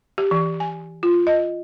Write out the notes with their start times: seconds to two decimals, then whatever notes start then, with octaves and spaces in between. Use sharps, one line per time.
0.18 G4
0.31 E3
0.60 G#5
1.03 F4
1.27 D#5